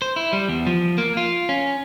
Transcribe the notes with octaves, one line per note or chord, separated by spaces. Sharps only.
C5
E4
G3
E2
F3
A#3
F4
C#4